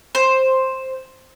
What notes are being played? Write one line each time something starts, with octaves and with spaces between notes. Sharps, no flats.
C5